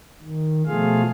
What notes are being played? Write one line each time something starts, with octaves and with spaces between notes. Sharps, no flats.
D#3
B2 F3 A3 F4 G#4 F5